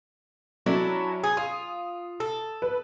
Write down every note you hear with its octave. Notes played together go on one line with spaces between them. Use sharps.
F#3 C#4 D4 E4 A4
G#4
F4 D#6
A4
B4